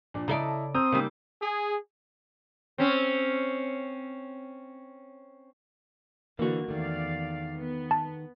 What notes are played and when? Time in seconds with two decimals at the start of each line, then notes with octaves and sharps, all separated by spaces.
0.14 A#2 F3 D4
0.28 C#3 E4 A4 D5 D#5 A#5
0.75 C4 A#5 D#6 E6 G6
0.92 C#3 G3 A#3 D#4
1.42 G#4
2.78 C4 C#4
6.39 D3 E3 A#3 F#4
6.68 E2 D#3 A3 D5 F5
7.57 B3
7.91 A5